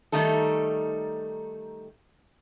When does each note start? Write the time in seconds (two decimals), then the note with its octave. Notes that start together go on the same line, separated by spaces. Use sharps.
0.12 D#3 G3 A3 D#4 A4